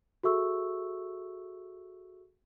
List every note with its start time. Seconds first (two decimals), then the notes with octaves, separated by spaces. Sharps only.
0.23 F#4 G#4 A4 E5 C#6 E6